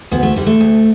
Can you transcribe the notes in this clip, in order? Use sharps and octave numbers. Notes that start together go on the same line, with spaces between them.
D2 B3
A3
D3 G3
A3
D2